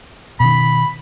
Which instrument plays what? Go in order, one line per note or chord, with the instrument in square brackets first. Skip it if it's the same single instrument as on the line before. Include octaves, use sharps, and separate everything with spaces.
[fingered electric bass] B2 D#3 [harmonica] B5